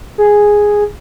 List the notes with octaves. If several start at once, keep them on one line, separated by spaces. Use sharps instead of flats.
G#4